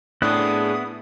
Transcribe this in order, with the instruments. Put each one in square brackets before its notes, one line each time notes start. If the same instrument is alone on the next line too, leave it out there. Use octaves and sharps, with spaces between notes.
[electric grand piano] A2 D4 [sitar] G#3 C4 [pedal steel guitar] B3 E4 F#6 [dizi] D#6